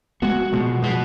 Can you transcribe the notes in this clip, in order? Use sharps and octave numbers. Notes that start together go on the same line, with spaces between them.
G#3 B3 F#4
B2 F3 G#3
F3 G#3 F#4